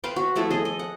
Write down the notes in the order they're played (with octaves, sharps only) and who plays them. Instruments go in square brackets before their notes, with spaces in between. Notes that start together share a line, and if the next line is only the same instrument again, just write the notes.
[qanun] B4 C5 F5 G5
F#4
F3 A3 E4 A4
G#4 A4 D#5
D#5
F#5